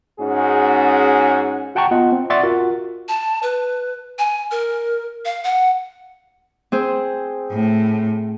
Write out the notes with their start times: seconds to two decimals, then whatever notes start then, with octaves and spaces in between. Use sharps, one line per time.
0.19 G#2 C#4 F#4 G#4
1.75 F#4 F#5 G5 A5 A#5 C#6
1.91 B3 F4 D#5 F#5
2.12 C4
2.30 D5 E5 F#5 C6 C#6 A6
2.43 F4 F#4 A#4
3.08 A5
3.43 B4
4.19 G#5
4.51 A#4
5.25 F5
5.44 F#5
6.72 C4 G#4 C5
7.51 A2